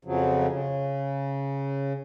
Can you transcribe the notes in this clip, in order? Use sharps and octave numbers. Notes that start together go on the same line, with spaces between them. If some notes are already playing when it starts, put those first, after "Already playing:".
F2 C#3 F3 F#3
C#3